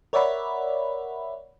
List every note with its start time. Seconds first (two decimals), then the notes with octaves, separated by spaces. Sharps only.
0.13 A#4 C#5 D5 E5 F#5 B5